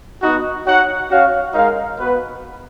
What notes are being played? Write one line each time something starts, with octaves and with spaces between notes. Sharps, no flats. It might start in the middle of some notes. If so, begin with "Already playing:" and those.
B3 D#4 F#4
D#4 F#4 C#5 F#5
C#4 F#4 C#5 F5
G#3 D#4 A#4 F5
B3 F#4 B4